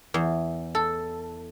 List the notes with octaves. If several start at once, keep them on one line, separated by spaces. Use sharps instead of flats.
E2
A4